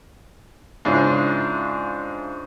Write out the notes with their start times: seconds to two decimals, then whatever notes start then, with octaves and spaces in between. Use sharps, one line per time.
0.85 G#2 C#3 D4 E4 F4